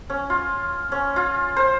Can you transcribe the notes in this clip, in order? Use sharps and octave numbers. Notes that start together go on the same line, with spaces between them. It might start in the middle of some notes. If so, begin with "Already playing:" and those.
C#4
F4
C#4
F4
C5